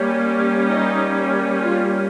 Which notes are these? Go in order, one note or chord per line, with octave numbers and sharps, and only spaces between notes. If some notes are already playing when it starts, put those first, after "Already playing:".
Already playing: G3 A#3 C#4
D#4
F4